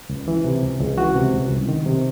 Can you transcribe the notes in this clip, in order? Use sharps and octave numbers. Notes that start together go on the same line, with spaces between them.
C#2
E3
C3
C#2
C#2
E3 F#4
C3
C#2
C2
D#3
C3